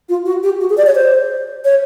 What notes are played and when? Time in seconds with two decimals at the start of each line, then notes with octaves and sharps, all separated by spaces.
0.09 F4
0.25 F#4
0.43 G4
0.60 F#4
0.70 G#4
0.77 D5
0.87 C#5
0.95 C5
1.65 C#5